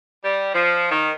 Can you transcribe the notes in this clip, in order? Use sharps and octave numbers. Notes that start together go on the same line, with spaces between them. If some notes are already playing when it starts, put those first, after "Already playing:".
G3
F3
D#3